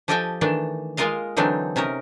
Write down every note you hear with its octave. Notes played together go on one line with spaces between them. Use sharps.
F3 G4 A4 D#5 G5 G#5
D#3 E3 A3 D4
G#3 A#3 F4 A#4 D#5 F5
D3 E3 F#3 C4 D4 D#4
C3 C#4 D#4 A#4